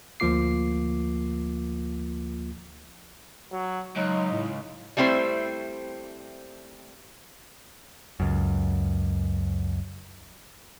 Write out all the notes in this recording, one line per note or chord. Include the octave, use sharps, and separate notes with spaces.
D2 F3 A#3 F4 D6 C7
F#3
C#2 F#3 D#4
A2
G3 A3 C4 E4 C5
C#2 F#2